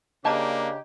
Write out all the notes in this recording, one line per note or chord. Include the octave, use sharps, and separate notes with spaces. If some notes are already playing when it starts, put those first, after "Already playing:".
C#3 A#3 D4 G4 D5 D#5 A5 A#5